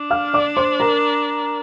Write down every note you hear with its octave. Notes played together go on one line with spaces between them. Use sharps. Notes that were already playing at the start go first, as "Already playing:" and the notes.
Already playing: D4
F5 F6
D5 D6
C5 C6
A#4 A#5